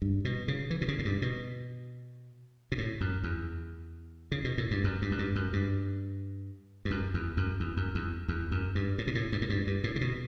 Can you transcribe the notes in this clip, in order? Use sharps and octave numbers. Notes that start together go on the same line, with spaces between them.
G2
B2
C#3
E3
B2
C#3
A2
G2
B2
B2
A2
F#2
E2
C#3
B2
A2
G2
F#2
G2
F#2
G2
F#2
G2
G2
F#2
E2
F#2
E2
F#2
E2
E2
F#2
G2
A2
B2
A2
G2
A2
G2
G2
A2
C#3
B2